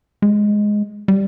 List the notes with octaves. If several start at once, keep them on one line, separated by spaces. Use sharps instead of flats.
G#3
G3